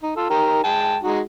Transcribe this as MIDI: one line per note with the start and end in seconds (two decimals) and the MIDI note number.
0.02 0.12 63
0.16 0.25 65
0.16 0.25 69
0.30 0.60 63
0.30 0.60 67
0.30 0.60 70
0.64 0.97 56
0.64 0.97 79
0.64 0.97 81
1.03 1.20 56
1.03 1.20 63
1.03 1.20 66